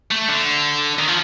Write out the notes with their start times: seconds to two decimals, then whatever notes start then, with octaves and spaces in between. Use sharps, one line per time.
0.11 A3
0.29 D3
0.99 D#3
1.08 F3